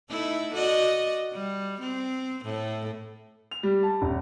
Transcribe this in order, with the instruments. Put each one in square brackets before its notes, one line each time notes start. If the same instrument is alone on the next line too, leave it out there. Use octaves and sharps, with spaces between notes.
[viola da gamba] A3 D#4 E4
F#4 D5 D#5
G3
C4
A2 A3
[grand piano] F7
G3
A5
D#1